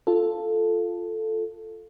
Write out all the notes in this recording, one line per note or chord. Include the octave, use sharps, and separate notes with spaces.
F4 A4